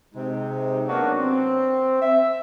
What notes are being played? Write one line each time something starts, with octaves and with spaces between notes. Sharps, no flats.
C3 G#3 D#4
F#3 A#3 B3 C#4 D4 F#4
C4
E5